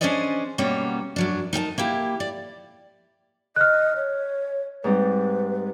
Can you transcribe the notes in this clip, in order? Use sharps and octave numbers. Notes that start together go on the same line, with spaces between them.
C#4 D4 G#4 C5 D5 D#5
B2 G3 A#3 B3 C#4
F#2 F#3 D4
D#4 A#4 G5 A5
A#3 E4 G4
D5
D#5 F6 F#6
C#5
G#2 G3 C4 B4